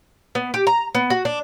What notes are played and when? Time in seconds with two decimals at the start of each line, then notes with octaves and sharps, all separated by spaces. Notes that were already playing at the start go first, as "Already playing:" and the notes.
0.35 B3
0.54 G4
0.67 A#5
0.95 B3
1.10 F#4
1.25 D4